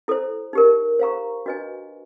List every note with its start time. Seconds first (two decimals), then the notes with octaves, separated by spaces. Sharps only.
0.08 E4 A4 C5
0.53 D#4 G4 A#4
0.99 C5 F5 A#5 C#6
1.46 D4 F#4 B4 D#5 G#5